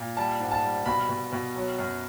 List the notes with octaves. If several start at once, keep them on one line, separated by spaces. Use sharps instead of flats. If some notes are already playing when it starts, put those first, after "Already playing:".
Already playing: A#2
G3 A5
G#2
A5
G3
B2 B5
B2
B2
F#3
F#2